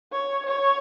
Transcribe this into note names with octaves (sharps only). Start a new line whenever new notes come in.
C#5
C#5